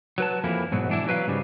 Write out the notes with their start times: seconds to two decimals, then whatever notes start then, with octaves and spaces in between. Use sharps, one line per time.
0.18 F#3 B4 A5
0.44 F2 E3 A#3 E4
0.72 G#2 B2 F#3
0.89 E3 D4 E4
1.08 F#3 B4 E5 F5
1.27 G#2 C#3 G3